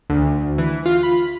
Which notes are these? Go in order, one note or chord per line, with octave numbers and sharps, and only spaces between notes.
D2
E3
F4
B5